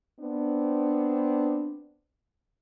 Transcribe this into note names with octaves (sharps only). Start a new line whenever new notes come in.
B3 C4 D4